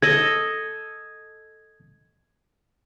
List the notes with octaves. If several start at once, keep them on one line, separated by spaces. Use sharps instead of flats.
A4 D#5 G#6